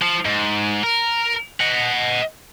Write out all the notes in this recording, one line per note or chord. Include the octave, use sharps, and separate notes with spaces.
F3
G#2
A#4
D#5 F#5